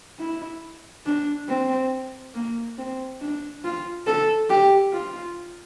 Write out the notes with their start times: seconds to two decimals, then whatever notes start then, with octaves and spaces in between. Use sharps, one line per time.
0.20 E4
1.06 D4
1.49 C4
2.34 A#3
2.78 C4
3.21 D4
3.65 F4
4.07 A4
4.50 G4
4.93 F4